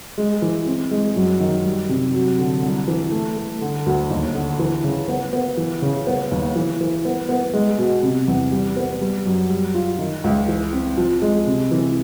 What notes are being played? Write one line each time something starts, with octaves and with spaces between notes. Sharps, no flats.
G#3
E3
C4
G#3
F#2
D#3
G3
C3
F#3
D3
C2
E3
A3
A3
D3
D2
D#2
D3
E3
C#3
B3
B3
E3
C#3
B3
D#2
E3
E3
B3
B3
G#3
B2
C3
E2
G3
B3
G3
F#2
G3
F4
D#3
C#2
E3
C4
F3
G#3
C3
E3